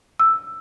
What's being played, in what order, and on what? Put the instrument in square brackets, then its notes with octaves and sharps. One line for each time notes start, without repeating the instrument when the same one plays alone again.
[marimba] E6